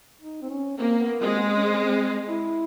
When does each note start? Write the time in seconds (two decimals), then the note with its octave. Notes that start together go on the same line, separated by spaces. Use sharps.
0.21 D#4
0.42 C4
0.49 C#4
0.78 A#3 C4
0.99 B3
1.21 G#3 C4
1.37 B3
1.42 C4
1.55 C#4
1.64 C4
1.85 C4
2.29 E4